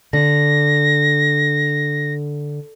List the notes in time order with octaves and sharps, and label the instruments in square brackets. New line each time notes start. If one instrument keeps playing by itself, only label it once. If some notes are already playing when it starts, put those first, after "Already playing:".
[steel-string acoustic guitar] D3 [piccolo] A#6